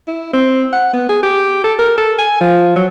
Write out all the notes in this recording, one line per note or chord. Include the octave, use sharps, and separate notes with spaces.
E4
C4
F#5
B3
G#4
G4
A4
A#4
A4
G#5
F3
F#3